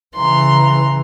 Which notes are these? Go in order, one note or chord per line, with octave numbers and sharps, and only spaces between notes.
C#3 E3 A#5 C6